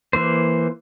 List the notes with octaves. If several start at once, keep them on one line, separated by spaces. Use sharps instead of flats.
E3 A#3 C5